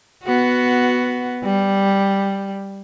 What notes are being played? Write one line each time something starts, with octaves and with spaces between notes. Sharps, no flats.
B3 F#4
G3